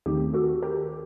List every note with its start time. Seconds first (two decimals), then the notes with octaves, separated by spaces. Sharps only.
0.06 D#2 D#3 A3 C4 D#4 G4
0.34 F#4 A4
0.63 G4 A#4